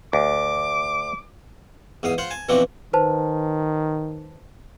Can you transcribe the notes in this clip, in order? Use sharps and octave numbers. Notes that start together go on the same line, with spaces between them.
D2 D6
E2 G#2 F5 D#6
F4 C5 F5 F#5
G#5 A5
B2 E3 F3 C4 D4 F#4
D#3 B4 C5 A5